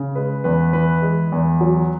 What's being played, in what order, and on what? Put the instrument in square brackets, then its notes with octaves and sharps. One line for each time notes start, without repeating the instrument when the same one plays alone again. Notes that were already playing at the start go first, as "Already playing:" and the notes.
Already playing: [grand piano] C#3
G#3 B4
E2 B4
E3 B4
G#3
E2
F#3